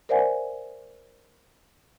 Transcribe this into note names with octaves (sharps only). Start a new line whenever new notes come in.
A#4 C5 D5 E5 F#5 G#5